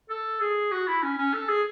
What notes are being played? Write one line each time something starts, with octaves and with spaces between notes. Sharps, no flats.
A4
G#4
F#4
E4
C#4
C#4
A4
G#4